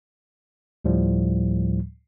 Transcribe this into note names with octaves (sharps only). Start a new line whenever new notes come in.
D2 A2 F3 G3